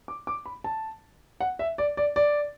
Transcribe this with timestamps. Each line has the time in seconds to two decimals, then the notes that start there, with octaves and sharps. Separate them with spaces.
0.08 D6
0.27 D6
0.46 B5
0.64 A5
1.40 F#5
1.59 E5
1.78 D5
1.97 D5
2.16 D5